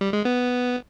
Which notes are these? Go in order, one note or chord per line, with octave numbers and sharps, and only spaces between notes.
G3
G#3
B3